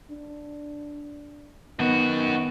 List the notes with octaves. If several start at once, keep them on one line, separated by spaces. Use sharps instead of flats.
D4
F#2 D#3 B3 F#4